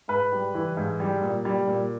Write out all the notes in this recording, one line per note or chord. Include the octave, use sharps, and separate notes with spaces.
G#2 B4
G3
E3
G#2
G3
A#2
G3
A#2